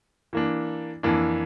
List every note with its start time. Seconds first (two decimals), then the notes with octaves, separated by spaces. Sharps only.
0.33 E3 A#3 D4
1.03 F2 E3 A#3 D4